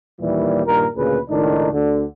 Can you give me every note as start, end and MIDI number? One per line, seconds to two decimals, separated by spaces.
0.21 0.62 39
0.21 0.62 46
0.21 0.62 52
0.21 0.62 55
0.66 0.86 43
0.66 0.86 46
0.66 0.86 51
0.66 0.86 70
0.96 1.17 38
0.96 1.17 46
0.96 1.17 49
0.96 1.17 68
0.96 1.17 71
1.29 1.71 37
1.29 1.71 45
1.29 1.71 51
1.29 1.71 62
1.29 1.71 63
1.72 2.04 38
1.72 2.04 50